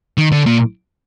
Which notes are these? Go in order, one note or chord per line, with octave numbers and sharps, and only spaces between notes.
D#3
D3
A#2